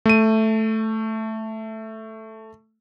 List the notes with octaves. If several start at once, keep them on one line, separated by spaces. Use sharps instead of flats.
A3 D#7